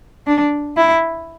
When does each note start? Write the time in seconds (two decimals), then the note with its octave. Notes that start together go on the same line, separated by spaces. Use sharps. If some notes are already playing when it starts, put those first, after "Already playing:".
0.27 D4
0.77 E4